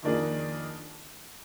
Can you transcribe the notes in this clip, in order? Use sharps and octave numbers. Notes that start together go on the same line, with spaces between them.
F2 D#3 A#3 D4 G#4